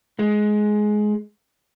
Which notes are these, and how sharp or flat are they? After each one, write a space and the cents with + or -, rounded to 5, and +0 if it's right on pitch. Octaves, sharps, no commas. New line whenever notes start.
G#3 +15